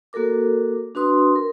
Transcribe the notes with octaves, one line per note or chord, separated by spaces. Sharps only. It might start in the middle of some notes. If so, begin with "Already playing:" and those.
A#3 F#4 A4 A#4 D6
D4 F#4 B4 C6 D#6
A#4